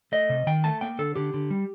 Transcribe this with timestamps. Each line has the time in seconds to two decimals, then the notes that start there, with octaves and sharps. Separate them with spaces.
0.12 A3 D#5
0.29 C3
0.47 D#3 G5
0.64 A3 A5
0.81 A#3 G5
0.99 D3 A4
1.16 D3 G4
1.34 D3
1.50 G3